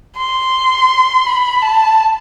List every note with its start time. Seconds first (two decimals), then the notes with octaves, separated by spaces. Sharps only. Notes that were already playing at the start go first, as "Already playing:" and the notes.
0.17 C6
1.26 B5
1.62 A5